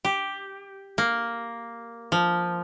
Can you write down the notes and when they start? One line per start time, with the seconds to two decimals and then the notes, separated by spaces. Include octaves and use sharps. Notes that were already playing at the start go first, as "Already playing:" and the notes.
0.05 G4
0.98 A#3
2.12 F3